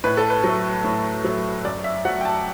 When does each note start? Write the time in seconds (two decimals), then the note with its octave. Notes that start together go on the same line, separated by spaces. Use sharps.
0.04 A2 B4
0.17 A4
0.30 B4
0.44 F#3 A3
0.84 A2
1.25 F#3 A3
1.65 F#2 D5
1.84 E5
2.05 F#3 A3 F#5
2.21 G5
2.25 A5